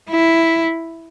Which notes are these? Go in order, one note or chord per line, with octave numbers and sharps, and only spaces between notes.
E4